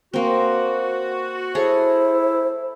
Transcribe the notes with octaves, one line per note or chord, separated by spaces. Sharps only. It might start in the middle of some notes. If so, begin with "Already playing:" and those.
A#3 C4 F#4
E4 G#4 A4 C5 C#5